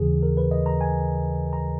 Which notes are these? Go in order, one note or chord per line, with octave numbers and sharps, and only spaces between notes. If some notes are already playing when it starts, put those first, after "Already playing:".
Already playing: D#2 C#3 E3 G#4
A#4
B4
D#5
A#5
G#5
A#5